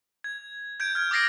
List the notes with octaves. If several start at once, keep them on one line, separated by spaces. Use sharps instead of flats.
G#6
G6 G#6 D7
F6 G#6
D6 D#6 A6 A#6 C7 D7